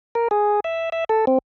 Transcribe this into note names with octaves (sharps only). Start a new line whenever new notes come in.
A#4
G#4
E5
E5
A4
C4